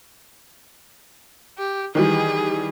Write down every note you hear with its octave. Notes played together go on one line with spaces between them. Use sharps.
G4
D#3 E3 G3 G#4